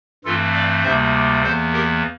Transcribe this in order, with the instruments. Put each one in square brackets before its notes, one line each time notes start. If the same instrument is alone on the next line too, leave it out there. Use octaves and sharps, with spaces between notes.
[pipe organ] G2 E3 A3 C4 F4 A4
D5 F5
D2 C3 G3 A#3 C5 E5
E2 E3 A#3 A4 C5
G4 A#4